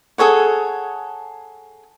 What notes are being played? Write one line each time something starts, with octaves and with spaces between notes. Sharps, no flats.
G#4 A4 C#5 F#5